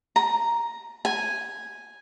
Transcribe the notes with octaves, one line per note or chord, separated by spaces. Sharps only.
A#5
G#5